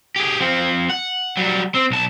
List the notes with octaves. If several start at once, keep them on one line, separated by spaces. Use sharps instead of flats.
G4 G#4
F3 C4
F#5
F#3 G3
C4
B1 A5